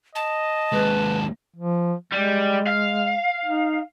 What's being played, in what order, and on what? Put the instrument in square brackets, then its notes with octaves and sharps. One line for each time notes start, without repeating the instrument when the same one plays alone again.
[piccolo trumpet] D#5 [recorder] A5
[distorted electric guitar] D#2 G#3 [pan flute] B4
[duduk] F3
[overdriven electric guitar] G3 [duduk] G#3
[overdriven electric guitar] F5
[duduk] D#4